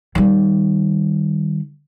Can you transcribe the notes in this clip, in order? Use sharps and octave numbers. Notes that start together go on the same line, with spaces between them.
D#3 G3